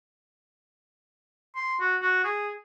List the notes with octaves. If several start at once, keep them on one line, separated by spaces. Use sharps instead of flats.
C6
F#4
F#4
G#4